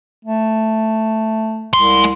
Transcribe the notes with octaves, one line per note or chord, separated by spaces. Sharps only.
A3
C2 G#3 C6